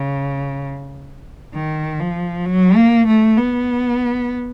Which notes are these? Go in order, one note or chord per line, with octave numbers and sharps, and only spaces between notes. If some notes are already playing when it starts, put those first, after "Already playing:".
Already playing: C#3
D#3
F3
F#3
A#3
A3
B3